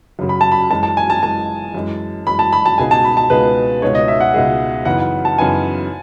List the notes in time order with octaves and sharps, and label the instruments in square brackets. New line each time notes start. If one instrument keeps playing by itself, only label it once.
[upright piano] F#2 C#3 F#3
[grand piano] B5
A5
B5
[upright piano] F#2 E3 G#3 [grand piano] A5
[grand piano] A5
G#5
A5
[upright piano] F#2 E3 G#3 [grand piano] A5
[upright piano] F#2 E3 G#3
[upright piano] F#2 E3 G#3 [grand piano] B5
[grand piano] A5
B5
A5
[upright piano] C#2 B2 G#3 D#4 G#4 [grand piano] G#5
[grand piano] A5
B5
A5
[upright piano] C#2 B2 G#3 D#4 G#4 [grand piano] B4
[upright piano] C#2 B2 G#3 D#4 G#4 [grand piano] C#5
[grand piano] D#5
E5
F#5
[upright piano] C#2 B2 G#3 D#4 G#4 [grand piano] E5
[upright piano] F#2 C#3 E3 B3 D#4 [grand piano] F#5
[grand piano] F#5
A5
[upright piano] F#2 C#3 E3 B3 D#4 [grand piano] G#5